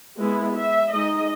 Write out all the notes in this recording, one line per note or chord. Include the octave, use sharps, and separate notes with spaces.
G#3 B3 E4
E5
G#3 D#4 D#5